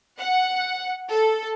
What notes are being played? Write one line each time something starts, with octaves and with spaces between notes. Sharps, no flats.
F#5
A4